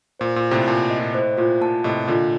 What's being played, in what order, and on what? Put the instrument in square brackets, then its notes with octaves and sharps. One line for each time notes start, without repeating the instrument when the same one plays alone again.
[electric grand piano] A#2 [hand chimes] C5
[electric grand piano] A#2
[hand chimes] F4
[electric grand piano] A2 C3
[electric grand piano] A#2 [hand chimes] A5
[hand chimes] D#5
[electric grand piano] A#2
[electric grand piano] A2 [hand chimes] C5
[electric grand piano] A#2 [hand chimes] F4
[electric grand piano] A#2 [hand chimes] A5
[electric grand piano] A2 C3 [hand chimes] D#5
[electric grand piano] A#2 D3 [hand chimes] F4